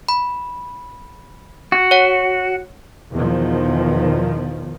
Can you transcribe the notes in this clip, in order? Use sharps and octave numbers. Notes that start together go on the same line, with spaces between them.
B5
F#4
C#5 F#5
E2 B2 D#3 F3